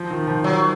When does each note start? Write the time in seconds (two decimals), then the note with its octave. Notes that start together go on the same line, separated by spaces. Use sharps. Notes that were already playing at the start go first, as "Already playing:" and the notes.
Already playing: F3
0.10 D#3
0.27 F3
0.44 F#3